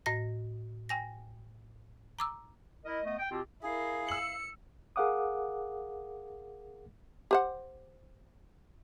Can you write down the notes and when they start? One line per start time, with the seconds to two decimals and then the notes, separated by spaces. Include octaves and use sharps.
0.06 A2 D#5 A#6
0.89 G5 G#5 A#6
2.19 A#5 D6 E6
2.85 E4 A#4 D#5
3.04 A3 B3 D#5
3.19 G5
3.31 B2 C4 F4 G4
3.63 E4 G#4 A#4 F5
4.09 E6 C#7 F#7
4.96 G#4 A#4 F5 F#5 D6 D#6
7.31 G4 C5 F#5